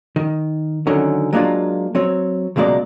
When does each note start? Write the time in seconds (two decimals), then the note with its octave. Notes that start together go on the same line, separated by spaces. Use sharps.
0.16 D#3
0.87 D3 D#3 F#3 C#4
1.33 F#3 G#3 A#3 D4 F4
1.95 F#3 C4 C#5
2.56 C#2 B2 F#3 G#3 A#3 D5